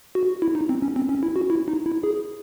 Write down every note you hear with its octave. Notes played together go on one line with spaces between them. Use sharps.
F#4
E4
D#4
C4
C#4
C4
C#4
E4
F#4
E4
D#4
E4
G#4